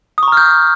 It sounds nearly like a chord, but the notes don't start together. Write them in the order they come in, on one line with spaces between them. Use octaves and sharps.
D#6 C#6 A#5 F6 G6